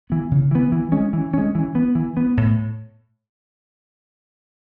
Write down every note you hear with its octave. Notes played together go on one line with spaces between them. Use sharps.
E3 B3
C#3
E3 B3
E3
G#3 C#4
E3
G#3 C#4
E3
B3
E3
B3
A2